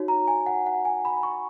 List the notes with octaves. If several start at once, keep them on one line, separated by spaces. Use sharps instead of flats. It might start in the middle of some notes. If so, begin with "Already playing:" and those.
Already playing: D#4 F#4 C#5
A#5
G#5
F#5
F#5
G#5
B5
C#6